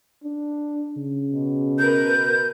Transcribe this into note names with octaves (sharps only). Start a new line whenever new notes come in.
D4
C#3
B2
A#4 B4 G6